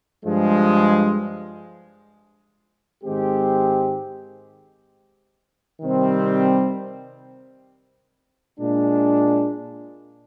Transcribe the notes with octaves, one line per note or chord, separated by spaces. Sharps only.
G2 F3 G#3
G#2 D#3 G#3 C4 G4
C3 D#3 G3 C4
A#2 G#3 D4